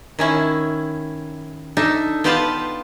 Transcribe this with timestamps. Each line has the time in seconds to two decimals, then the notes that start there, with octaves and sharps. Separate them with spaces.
0.19 D#3 C#4 E4
1.77 D4 D#4 A4 E5
2.24 B3 F4 G4 B4 F5 A5